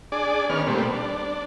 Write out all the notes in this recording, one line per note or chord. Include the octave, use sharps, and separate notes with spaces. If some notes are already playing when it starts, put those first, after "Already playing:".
D4 G#4 D5
D#3 B3 C#4 F6
A#2 G3 A3 B3 C4
D4